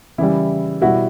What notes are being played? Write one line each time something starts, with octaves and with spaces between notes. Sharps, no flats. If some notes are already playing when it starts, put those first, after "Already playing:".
C#3 E3 G3 E4
B2 G3 E4 F#4